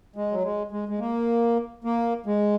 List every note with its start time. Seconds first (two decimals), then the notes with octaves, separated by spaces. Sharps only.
0.16 G#3
0.32 F#3
0.43 G#3
0.71 G#3
0.89 G#3
0.99 A#3
1.84 A#3
2.26 G#3